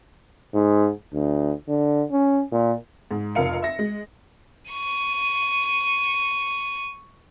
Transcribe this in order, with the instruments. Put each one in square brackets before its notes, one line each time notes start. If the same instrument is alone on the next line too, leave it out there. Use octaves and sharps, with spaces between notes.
[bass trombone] G#2
D2
D3
C#4
A#2
[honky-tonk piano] G#2
F1 F2 A#4 F5 C#7
E5 A#6
G#3
[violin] C#6 D#7